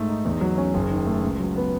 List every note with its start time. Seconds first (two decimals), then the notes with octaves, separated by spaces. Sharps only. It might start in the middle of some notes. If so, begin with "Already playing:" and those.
Already playing: G#2 A3
0.08 D#4
0.25 E2
0.41 F#3
0.58 C#4
0.74 F#1
0.90 D#3
1.06 A3
1.23 C#2
1.39 F#3
1.56 B3